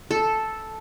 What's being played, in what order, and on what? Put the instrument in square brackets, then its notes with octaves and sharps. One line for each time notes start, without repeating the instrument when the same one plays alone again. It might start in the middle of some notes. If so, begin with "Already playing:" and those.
[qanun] A4